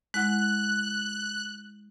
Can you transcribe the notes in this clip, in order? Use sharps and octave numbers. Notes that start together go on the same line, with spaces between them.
G#3 E4 F#5 F#6